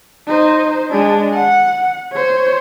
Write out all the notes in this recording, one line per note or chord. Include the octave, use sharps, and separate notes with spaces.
D#4 C5
G#3 D4
F#5
C5 C#5